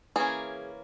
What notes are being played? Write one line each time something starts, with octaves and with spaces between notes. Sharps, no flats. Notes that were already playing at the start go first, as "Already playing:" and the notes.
E3 A#3 C#4 G#4